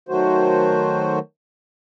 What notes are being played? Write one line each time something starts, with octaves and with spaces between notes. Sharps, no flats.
D#3 F#3 A3 F#4 C5